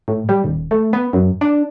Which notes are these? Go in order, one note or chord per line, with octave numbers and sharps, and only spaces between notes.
A2
G3
D#1
A3
B3
F#2
D4